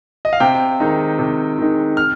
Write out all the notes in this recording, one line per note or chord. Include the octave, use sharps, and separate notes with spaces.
D#5
F5
C3 G5
D#3 G#3 D#4
C3
D#3 G#3 D#4
F6